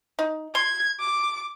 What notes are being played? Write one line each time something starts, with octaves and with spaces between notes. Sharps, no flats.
D#4
C6 G#6
D6